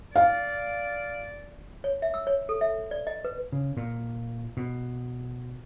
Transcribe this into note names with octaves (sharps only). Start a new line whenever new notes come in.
D5 F5
C#5
E5
E6
C#5
A4
E5
D5
D#5
B4
C#3
A#2
B2